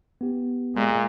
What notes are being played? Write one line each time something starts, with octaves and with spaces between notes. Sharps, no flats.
B3 G4
A#2 G#3